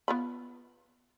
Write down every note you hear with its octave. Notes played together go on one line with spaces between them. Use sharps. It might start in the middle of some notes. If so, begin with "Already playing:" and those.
B3 F4 B5